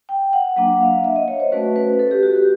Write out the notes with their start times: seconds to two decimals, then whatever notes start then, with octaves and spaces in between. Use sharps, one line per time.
0.09 G5
0.33 F#5
0.56 F#3 A#3 D4 F#5
0.81 F5
1.04 E5
1.16 D#5
1.28 C#5
1.40 C5
1.52 A3 C#4 F#4 B4
1.76 B4
1.99 A4
2.11 G4
2.23 F#4
2.35 G4